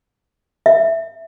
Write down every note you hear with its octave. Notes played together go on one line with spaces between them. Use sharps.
E5